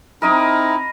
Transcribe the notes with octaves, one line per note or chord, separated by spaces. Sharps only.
C4 D#4 E4 A#4 D#5 B5